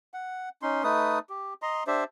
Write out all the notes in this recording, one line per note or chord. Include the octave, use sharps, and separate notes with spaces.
F#5
C#4 D#4 C6
A3 D#4 B4 D#6
G4
D#5 A#5 C6
D4 G4 C5 E5